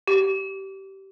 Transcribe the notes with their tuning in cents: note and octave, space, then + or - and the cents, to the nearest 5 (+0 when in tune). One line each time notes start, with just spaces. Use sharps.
G4 -20